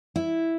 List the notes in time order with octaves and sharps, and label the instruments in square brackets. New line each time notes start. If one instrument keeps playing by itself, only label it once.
[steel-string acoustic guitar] E4